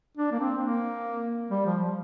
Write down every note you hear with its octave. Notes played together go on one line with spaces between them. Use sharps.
D4
A#3
C4
A#3
G3
F3